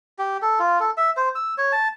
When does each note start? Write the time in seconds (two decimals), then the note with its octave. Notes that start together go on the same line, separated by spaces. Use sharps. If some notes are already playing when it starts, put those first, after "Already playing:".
0.18 G4
0.42 A4
0.59 F4
0.80 A4
0.97 E5
1.17 C5
1.35 E6
1.58 C#5
1.72 A5